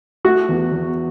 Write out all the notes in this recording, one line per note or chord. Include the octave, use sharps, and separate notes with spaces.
A3 F#4
E2
E2